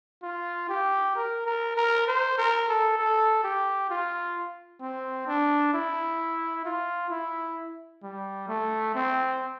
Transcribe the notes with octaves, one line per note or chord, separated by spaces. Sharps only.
F4
G4
A#4
A#4
A#4
C5
A#4
A4
A4
G4
F4
C4
D4
E4
F4
E4
G3
A3
C4